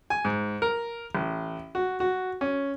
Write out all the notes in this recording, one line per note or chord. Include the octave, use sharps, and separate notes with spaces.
G#5
G#2
A#4
A1
F#4
F#4
C#4